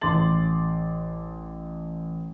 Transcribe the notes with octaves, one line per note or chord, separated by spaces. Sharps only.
A1 C6 D6 A6 F#7